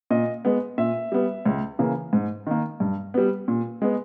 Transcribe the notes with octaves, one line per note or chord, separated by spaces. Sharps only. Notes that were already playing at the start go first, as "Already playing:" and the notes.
A#2 D#5
G#3 B3
A#2 E5
G3 B3
C#2
C#3 E3 A#3
G#2
D#3 A#3
G2
G3 B3
A#2
G#3 B3